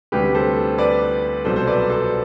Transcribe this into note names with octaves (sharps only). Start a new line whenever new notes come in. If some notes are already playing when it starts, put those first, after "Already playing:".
D2 C3 G3 G4 B4
A4 C5
B4 D5
C2 B2 F#3 A4 C5
C5
B4 D5
A4 C5